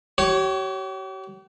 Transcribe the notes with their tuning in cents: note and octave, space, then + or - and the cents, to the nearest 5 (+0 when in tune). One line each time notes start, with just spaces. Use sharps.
G4 -45 C#5 +0